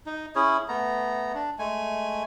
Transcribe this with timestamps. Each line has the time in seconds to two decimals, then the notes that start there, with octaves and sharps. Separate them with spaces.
0.06 D#4
0.35 C#4 E4 G#4 C#5
0.68 A3 B3 A#5
1.35 D4
1.59 G#3 A3 G#5